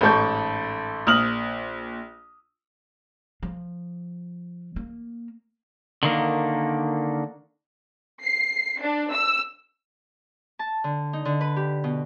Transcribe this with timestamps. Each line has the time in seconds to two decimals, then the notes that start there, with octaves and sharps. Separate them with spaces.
0.01 A1 G#2 A4 C#6 G6
1.07 A#1 D#6 F6 F#7
3.43 F3
4.76 A#3
6.03 D3 D#3 A#3
8.22 C7
8.80 D4
9.11 E6
10.59 A5
10.84 D3
11.13 D#4
11.25 D3
11.41 B4
11.56 G4
11.84 B2